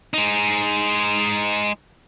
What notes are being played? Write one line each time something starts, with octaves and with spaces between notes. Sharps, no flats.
G#3 D#4